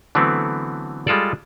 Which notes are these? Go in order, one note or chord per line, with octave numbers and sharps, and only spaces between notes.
D3 E3 F#3 A3 B3 C4
G3 G#3 F4 A4 D5